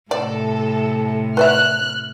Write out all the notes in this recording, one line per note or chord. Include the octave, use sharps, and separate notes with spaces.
A2 C3 A4 D5
B4 D5 E5 F6 F#6